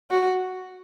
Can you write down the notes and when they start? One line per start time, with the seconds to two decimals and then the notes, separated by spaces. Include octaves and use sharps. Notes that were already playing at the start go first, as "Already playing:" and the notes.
0.11 F#4